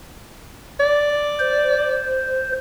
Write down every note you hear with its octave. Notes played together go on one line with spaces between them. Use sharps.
D5
C5